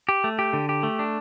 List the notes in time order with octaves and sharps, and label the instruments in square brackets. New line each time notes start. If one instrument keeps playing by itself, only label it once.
[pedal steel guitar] G4
A3
G4
D3
G4
A3
D4